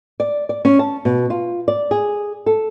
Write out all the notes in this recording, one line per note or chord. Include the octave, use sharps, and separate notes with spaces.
D5
D5
C#4
A5
B2
F4
D5
G#4
A4